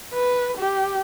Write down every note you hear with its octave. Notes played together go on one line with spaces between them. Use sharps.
B4
G4